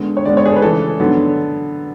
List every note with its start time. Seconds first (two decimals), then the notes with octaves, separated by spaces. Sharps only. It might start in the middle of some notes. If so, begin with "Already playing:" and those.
Already playing: D3 G#3 B3
0.17 C#5
0.25 D3 G#3 B3 D5
0.37 C#5
0.46 G#4
0.50 A4
0.56 B4
0.61 C#3 E3 A3 A4
1.00 D3 F#3 B3